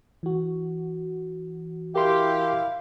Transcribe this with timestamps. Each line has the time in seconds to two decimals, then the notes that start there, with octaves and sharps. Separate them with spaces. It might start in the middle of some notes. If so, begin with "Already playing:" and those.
0.23 E3 F#4
1.95 E4 G4 A#4 F5 C6